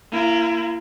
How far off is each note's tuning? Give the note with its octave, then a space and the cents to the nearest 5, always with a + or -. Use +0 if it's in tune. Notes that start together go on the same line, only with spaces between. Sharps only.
A#3 -5 E4 +35